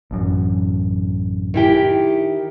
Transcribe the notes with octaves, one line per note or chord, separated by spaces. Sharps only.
A1 F#2
D#3 E4 G4